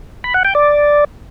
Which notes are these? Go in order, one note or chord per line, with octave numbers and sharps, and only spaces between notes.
B5
F#5
G5
D5